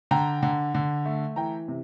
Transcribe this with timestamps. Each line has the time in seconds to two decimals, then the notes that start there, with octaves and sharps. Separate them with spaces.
0.11 D3 G5 A#5
0.43 D3
0.75 D3
1.05 A3
1.36 E3 G5 A#5
1.68 C3